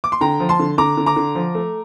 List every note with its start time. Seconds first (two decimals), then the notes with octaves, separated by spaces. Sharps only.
0.04 D6
0.12 C6
0.21 D3 G5 A#5
0.40 F3
0.49 A5 C6
0.59 D3
0.78 D3 A#5 D6
0.97 D3
1.06 A#5 D6
1.16 D3
1.35 F3
1.55 A3